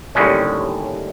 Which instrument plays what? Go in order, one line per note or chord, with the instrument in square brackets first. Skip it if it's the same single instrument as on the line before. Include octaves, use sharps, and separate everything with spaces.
[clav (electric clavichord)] D#2 A2 D3 G3 G#3 C#4